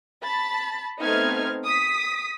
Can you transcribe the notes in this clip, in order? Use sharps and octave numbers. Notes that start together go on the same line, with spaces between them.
A5 B5 A6
A3 B3 C4 D#4 F6 G#6
D#6 B6